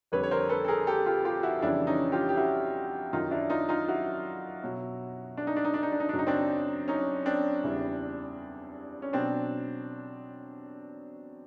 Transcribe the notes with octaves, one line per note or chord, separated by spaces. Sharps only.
F2 D3 G3 B4 C#5
C#5
A#4 C5
A4 B4
A4
G#4 A#4
G4 A4
F4 G4
F4 G4
E4 F#4
F2 C#3 E3 G3 D4 E4
C#4 D#4
F4 G4
G4
E4 F#4
F#2 D#3 F#3 D#4 F4
D4 E4
D#4 F4
D#4 F4
E4 F#4
B2 F#3
D4
D#4
D4
D#4
D4
D#4
D4
D#4
D4
F#2 C#3 F#3
D#4
C4 D4
C#4 D#4
C4 D4
E2 C#3 E3 G3
C#4
B2 F#3 C4 D4